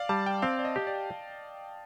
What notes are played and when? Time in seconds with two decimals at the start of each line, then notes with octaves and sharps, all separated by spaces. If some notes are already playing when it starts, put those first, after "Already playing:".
Already playing: D5 F5
0.09 G3 A5
0.26 G5
0.42 C4 F5
0.59 D5
0.65 D#5
0.76 G4
0.87 D5